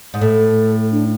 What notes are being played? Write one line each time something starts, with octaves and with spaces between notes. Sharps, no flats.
G#2
A2 A4
D4